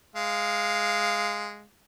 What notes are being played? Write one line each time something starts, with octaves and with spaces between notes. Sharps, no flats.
G#3 F5